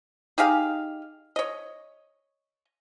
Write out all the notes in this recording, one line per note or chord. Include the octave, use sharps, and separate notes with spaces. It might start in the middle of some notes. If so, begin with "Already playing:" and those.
D#4 G4 G#4 F5
C#5 D#5